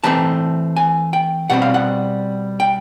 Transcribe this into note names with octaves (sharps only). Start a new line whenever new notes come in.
E3 A3 C4 A5
G#5
G5
B2 G3 C4 F#5
F5
F#5
G5